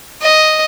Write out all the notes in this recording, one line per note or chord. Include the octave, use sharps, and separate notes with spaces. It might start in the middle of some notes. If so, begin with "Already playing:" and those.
D#5